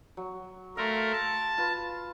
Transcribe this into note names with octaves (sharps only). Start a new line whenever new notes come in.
F#3
A3 A#4 F5 C6
A5
F4 B4